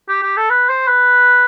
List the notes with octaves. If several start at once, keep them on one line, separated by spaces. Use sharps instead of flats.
G4
G4
A4
B4
C5
B4